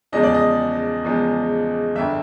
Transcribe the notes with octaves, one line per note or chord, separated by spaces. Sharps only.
E2 C#3 F3 G#3 D#5
D5
D#5
E2 C#3 F3 G#3
G1 F2 D3 E5